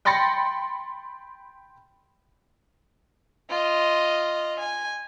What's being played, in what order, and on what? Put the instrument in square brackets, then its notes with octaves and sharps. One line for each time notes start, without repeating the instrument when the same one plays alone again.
[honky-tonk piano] G5 B5 C6 A6 A#6 C#7
[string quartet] F4 D#5
G#5